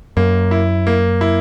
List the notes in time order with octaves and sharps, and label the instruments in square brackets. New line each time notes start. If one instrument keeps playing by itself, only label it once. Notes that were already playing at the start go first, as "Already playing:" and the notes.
[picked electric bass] F#2 [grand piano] A#3
[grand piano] E4
A#3
E4